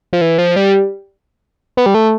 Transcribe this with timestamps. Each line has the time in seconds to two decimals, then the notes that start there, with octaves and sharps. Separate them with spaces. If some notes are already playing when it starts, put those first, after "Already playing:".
0.13 F3
0.21 E3
0.38 F3
0.56 G3
1.77 B3
1.86 G3
1.94 A3